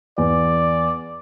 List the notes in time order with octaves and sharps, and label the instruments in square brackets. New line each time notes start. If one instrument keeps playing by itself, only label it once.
[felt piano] E2 [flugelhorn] D5